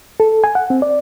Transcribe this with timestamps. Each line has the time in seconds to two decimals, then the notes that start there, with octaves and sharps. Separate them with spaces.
0.20 A4
0.44 G#5
0.55 F#5
0.70 C4
0.82 D5